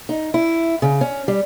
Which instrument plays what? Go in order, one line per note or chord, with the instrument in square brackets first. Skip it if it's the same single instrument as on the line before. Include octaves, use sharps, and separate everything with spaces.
[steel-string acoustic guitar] D#4
E4
C#3
C#4
G3